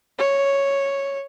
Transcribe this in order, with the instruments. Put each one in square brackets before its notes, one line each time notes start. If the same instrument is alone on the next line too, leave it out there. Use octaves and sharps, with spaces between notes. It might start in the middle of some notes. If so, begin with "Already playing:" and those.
[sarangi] C#5